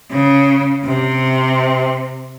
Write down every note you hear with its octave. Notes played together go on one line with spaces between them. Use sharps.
C#3
C3